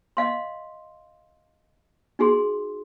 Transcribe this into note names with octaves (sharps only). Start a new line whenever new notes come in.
D#5 F5 C6
D#4 F#4 G#4 C6